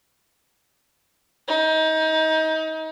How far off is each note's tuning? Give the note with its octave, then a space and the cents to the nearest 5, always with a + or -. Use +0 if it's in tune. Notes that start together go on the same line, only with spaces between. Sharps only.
D#4 +30